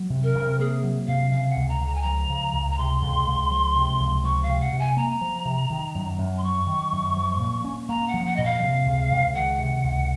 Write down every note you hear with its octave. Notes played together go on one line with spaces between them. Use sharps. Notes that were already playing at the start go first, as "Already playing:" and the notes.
Already playing: F#3
C3
A#4
C3
A#3 G#4
F#3
C3 F5
C#3 F5
F#5
C#2
A#5
C#2
A#5
G#5
F3 A#5
C#3
C#2
A#5
C3 C6
C#2
C#2
F3
C3
C#2
F3 C#6
F5
C3
F#5
C3
G#5
A#3 A#5
F3
C3
D#3
F#2
F#2
C6
F#3 C#6
D#3
F#2
F3
A#2
C#4
A#3 A#5
F#5
F3
F#5
A#2 D#5
F5
C3
C#2
C#2
D#3 F#5
C3
C#2